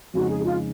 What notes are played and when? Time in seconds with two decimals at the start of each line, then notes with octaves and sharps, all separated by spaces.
0.14 F2 C#3 G#3 D#4 F#4
0.29 G#4
0.44 F4